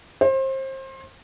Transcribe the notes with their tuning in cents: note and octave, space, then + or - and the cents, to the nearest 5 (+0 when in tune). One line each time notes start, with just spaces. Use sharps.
C5 +30